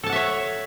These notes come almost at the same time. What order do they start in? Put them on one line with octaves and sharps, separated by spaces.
A4 A5 F#5 E5 C#5